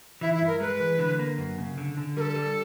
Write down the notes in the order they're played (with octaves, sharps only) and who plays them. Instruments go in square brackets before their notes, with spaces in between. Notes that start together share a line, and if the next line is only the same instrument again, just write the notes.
[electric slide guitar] E3 [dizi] E4
[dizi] E4
[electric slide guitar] G2
[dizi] A#4
[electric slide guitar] G#3 [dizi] B4
[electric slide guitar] E3
D3
A#3
F#2
C#3
D3
D3
[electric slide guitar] G3 [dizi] A4 A#4
[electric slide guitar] G3